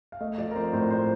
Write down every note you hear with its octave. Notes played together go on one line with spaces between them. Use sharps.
F5
A3 D#5
F3 D5
A#4
C4 C5
A2 C5
A3 C5